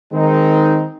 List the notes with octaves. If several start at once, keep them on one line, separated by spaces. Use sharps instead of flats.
D#3 G#3 C4 D#4